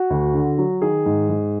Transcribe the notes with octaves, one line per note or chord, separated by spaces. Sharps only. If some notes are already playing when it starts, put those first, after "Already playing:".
Already playing: F#4
D2
D3
F#3
D#3 G#4
G#2
G#2